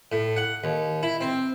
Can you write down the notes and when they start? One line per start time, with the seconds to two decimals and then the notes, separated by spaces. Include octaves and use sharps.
0.12 A2
0.37 F#5
0.64 D#2
1.03 E4
1.21 C4